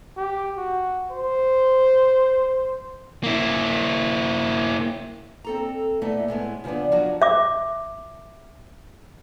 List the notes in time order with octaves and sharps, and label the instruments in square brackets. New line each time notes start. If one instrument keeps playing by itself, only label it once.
[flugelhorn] G4
F#4
C5
[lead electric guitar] A#3 E4
[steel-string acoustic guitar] C4 A4 A#5
A#2 A3 B3 E4 D#5
A2 G#3 B3
C#3 F3 G3 B3 D4
F3 F#3 C#4 D4 F#4
[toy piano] E5 D6